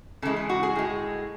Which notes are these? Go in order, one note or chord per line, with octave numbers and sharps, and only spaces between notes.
C#3 E3 G#3 A4
G#4
F#4
G#4
A2 G#3